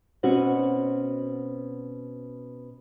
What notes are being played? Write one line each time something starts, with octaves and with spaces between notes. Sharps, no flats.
B2 C4 C#4 F#4